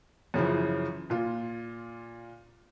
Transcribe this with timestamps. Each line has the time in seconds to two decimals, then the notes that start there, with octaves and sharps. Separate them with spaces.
0.34 F#2 C#3 E3 F3
1.10 A#2 F4